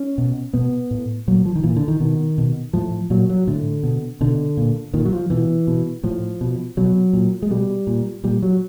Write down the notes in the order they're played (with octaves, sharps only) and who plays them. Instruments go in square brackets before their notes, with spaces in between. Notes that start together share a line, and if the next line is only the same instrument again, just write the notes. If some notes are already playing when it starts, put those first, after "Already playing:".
Already playing: [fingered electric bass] C#4
B2
B2 B3
A2
A#2 F#3
F3
D#3
A#2 E3
D3
D#3
B2 D#3
B2
A2 F3
A#2 F#3
F#3
A2 D3
B2
B2 D3
A#2
A#2 D#3
F#3
F3
B2 E3
B2
A2 F3
B2
B2 F#3
A#2
G#3
B2 G3
A#2
A#2 G3
F#3